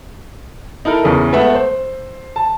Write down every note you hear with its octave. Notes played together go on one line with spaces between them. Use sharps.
D#4 E4 A4 A#4
E2 C#3 E3
G#3 A3 B3 B4 E5 F#5
C5
A5